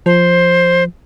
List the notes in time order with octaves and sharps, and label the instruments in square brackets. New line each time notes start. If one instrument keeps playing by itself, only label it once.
[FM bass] F3 [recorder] C5